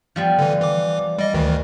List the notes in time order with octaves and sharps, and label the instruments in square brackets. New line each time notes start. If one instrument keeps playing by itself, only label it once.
[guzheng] F3 G3 B3
[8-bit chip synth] D3 E3
E3 D6
[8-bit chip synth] G3 D#5 [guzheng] D5
[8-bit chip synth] D2 D#3 E3